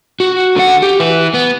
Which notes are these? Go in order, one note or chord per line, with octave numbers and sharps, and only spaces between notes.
F#4
D3 F#5
G4
E4 B4
B3